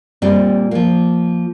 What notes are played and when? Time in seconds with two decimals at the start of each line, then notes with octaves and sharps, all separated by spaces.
0.22 A#2 G3 C4
0.71 F3 A#3